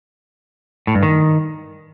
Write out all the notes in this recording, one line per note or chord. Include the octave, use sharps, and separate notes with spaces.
A2
G2
D#3